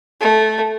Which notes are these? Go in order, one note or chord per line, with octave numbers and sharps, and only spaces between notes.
A3